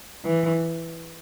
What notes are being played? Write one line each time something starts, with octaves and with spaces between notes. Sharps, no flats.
E3